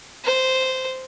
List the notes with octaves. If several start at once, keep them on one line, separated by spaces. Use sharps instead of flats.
C5